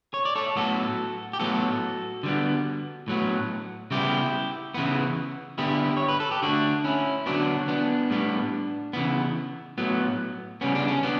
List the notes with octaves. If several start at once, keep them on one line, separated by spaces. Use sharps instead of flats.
C#5
D5
A4 C#5
A2 F#3 B3 F#4 A4
G4
A2 F#3 B3 F#4 A4
D3 G3 B3
A2 F#3 B3
C#3 G3 B3 E4 G4
C#3 E3 B3
D3 G3 B3 E4 G4
C#5
B4
A4
G4
D3 A3 D4 F#4
C#4 E4
D3 F#3 B3 D4 F#4
B3 D4
A2 G3 B3
C#3 E3 B3
A2 F#3 B3
C#3 G3 B3 C#4
D4
C#4
B3 D4